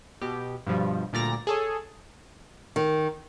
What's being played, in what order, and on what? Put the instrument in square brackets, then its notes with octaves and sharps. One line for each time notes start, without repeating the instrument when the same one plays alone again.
[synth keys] B2 G4
G2 B2 F3 G3
D2 A#2 G3 D5 A#5 A#6
G#4 A4 C#5
[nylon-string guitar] D#3